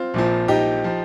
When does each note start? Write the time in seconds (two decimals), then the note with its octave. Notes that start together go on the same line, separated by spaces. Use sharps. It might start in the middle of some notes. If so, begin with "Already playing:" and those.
Already playing: C4 F4
0.14 A#1 A#2 F3
0.48 D#4 G4
0.84 F3